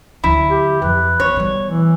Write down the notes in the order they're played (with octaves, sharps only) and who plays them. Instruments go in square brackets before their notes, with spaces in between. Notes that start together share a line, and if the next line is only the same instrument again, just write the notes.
[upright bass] D2 F#3 [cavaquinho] E4
[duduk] G4
[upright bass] F2 [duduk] B4
[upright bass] B1 [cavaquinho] C#5
[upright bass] B2 G3
[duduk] E3